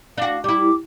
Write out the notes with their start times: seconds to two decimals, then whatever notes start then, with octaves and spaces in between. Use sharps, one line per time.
0.18 D4 F#4 F5
0.44 G3 E4 D6